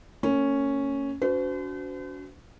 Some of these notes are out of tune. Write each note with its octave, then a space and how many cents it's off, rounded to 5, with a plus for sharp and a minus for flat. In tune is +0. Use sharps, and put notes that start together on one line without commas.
A#3 -35 C#4 +0
D4 -45 F#4 +0 C5 -45